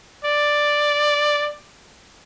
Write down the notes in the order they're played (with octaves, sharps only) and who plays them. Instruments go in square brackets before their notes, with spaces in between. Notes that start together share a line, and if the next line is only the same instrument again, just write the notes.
[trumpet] D5